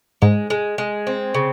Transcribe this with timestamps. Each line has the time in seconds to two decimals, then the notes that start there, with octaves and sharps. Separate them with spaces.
0.22 G#2 G#3
0.50 G#3
0.78 G#3
1.07 C4
1.34 C#3